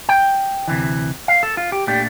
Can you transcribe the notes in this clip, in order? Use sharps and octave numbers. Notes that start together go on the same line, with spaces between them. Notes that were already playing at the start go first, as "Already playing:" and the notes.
G5
D2 C3 E3
F5
A4
F4
G4
A#2 A3 D4 G4